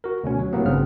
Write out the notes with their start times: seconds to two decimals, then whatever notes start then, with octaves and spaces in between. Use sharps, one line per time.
0.04 F#4 A#4
0.24 D2 B2 C#4
0.39 F#3
0.53 A2 C3 F#3 A#3 B3
0.65 G#1 G2 C#3 B3 C4 F6